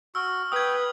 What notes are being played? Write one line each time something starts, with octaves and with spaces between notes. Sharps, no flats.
F#4 E6 F6
B4 G5 D#6 G#6